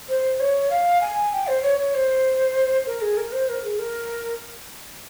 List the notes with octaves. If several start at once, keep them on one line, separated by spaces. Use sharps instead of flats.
C5
C#5
F5
G#5
G5
C5
C#5
C#5
C5
A#4
G#4
A#4
C5
A#4
G#4
A#4